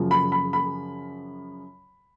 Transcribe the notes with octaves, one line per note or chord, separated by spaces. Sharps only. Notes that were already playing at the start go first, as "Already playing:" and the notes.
Already playing: F#2 C#3 F3
B5
B5
B5